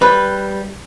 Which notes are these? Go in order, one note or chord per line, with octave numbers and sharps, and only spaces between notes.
G3 B4